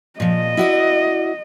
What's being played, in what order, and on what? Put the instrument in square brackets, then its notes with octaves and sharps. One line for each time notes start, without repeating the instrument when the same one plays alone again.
[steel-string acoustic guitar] A#2 F3 [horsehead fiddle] D#5
[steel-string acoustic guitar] E4 F#4 D5